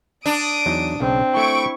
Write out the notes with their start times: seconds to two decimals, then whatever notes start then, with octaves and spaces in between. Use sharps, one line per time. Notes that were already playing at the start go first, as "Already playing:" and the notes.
0.26 D4 D#6 D7
0.66 E2 F#3 D#4
1.00 B1 C#3 C4
1.34 A3 E4 G5 C#6 D7